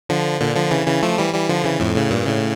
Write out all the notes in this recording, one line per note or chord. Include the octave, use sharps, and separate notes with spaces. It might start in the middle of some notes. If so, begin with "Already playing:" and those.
D3 F3
A#2 D3
D3 F3
C#3 E3
C#3 E3
F3 A3
E3 G3
E3 G3
D3 F3
C#3 E3
F2 A2
A2 C#3
G2 A#2
A2 C#3